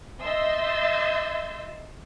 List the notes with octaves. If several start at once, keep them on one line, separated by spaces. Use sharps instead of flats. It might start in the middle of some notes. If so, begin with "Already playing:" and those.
D#5 E5 C6 E6 G6 A6